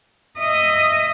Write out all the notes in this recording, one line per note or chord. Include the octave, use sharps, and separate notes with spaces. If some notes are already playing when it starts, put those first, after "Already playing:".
D#5 E5